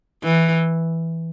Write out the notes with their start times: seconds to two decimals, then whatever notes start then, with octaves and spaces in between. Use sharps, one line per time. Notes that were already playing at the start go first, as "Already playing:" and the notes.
0.24 E3